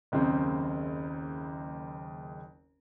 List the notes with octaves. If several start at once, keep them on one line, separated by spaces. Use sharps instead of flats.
F#1 D#2 C#3 C4